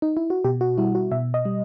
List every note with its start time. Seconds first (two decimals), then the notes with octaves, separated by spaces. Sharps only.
0.02 D#4
0.17 E4
0.30 F#4
0.45 B2 G4
0.61 F#4
0.78 G3 E4
0.95 F#4
1.11 B2 E5
1.34 D#5
1.45 G3